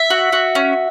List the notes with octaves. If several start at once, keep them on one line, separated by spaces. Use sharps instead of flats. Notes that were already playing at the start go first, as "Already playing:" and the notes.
Already playing: E5
F#4
F#4
C#4